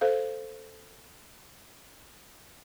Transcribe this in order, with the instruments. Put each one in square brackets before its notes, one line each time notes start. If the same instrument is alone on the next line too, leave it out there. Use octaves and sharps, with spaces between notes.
[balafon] A4 C5 F5